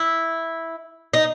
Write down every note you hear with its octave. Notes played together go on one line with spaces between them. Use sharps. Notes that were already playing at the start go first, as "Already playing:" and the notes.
Already playing: E4
D#4